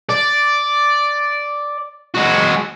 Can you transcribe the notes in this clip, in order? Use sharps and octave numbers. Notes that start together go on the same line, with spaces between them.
D5
G#3 F#4